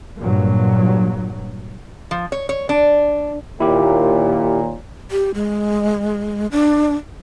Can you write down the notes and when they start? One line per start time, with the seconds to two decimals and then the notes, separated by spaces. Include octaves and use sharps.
0.20 G2 A#2 F#3
2.11 F3
2.32 C#5
2.49 C#5
2.69 D4
3.60 D#2 A#2 E4 G4
5.11 G4
5.34 G#3
6.52 D4